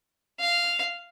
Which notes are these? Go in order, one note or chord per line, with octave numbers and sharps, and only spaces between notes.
F5